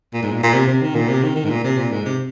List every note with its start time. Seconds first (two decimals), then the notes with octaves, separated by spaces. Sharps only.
0.14 A#2
0.23 G#2
0.33 A#2
0.43 A#2
0.54 C3
0.68 C3
0.82 D#3
0.95 A#2
1.09 C3
1.23 D#3
1.36 D#3
1.45 G#2
1.50 A#2
1.64 C3
1.78 A#2
1.92 G#2
2.06 C3